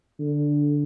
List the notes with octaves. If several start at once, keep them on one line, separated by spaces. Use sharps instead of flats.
D3